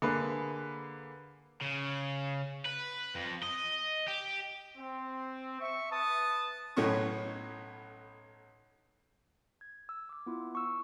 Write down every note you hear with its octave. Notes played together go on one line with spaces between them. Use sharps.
D3 A#3 G#4 B4
C#3
B4
F2
D#5
G4
C4
E5 C#6
B4 A5 D#6
B1 A2 A3 B3 C#4 C#6
G#6
E6
D6 E6
B3 E4 F4
C#6 E6